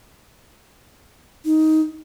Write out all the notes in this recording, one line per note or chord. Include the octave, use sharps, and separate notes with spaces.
D#4